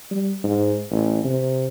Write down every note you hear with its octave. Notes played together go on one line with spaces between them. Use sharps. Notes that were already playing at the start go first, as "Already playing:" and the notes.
G3
G#2
A1
C3